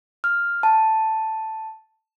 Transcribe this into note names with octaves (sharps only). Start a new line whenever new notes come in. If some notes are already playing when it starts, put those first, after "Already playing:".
F6
A5